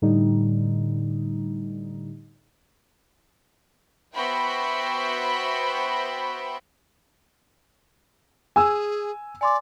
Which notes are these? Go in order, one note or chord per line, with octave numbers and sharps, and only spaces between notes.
A2 D3 G3 D#4
B3 F#4 C5 E5 G5 B5
G#4 G#5 E6
D5 G#5 C6 D6